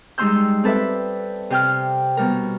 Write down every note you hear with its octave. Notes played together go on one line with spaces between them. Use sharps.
G3 G#3 D#4 C6 E6 G6
C4 A4 B4 D5 E5
C3 G5 F6
B2 G3 A#4